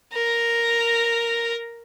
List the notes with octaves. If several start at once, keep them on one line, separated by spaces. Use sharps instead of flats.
A#4 A#5